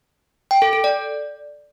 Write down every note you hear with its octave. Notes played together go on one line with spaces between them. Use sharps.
G5
A4
A4
D5